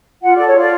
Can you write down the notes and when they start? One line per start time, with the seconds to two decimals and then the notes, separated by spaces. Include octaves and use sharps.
0.22 F4 F#5
0.34 A4 D5
0.46 C#5
0.54 F4 D5